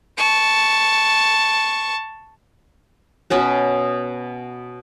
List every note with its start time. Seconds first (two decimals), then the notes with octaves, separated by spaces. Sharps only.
0.17 A5 C#6
3.30 B2 B3 C#4 F#4